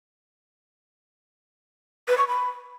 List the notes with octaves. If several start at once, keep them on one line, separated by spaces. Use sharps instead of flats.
B4
C#6
B5